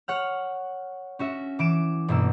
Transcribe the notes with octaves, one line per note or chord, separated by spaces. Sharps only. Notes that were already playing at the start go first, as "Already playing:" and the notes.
C#5 F#5 F6
C#4 F#4 E5
E3 D6 D7 E7
G1 B2 A#3 E6